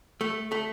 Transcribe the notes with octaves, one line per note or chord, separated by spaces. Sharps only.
A3
A3